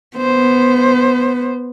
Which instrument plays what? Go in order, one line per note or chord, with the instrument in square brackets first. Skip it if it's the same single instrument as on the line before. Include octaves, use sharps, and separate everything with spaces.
[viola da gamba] B3 [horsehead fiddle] C5